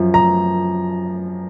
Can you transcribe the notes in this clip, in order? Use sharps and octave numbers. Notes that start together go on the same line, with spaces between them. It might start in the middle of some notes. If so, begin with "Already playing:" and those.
Already playing: F#2 F3
A#5